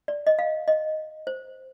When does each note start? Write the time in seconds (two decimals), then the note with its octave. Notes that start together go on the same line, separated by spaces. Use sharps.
0.08 D5
0.27 D#5
0.39 F5
0.68 D#5
1.27 C5